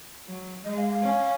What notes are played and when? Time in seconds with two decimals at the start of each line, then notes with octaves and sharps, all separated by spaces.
0.27 F#3
0.65 G#3 D#5
0.77 F5
0.90 F5
1.02 C#4